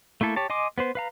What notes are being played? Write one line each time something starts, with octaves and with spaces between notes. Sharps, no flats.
A3 A#3 E4 A4
G4 C#5 A5
D#5 G#5 C6 D6
B3 B4 C5
B4 F5 A#5